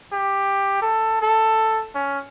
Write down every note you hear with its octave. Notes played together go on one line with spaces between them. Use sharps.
G4
A4
A4
C#4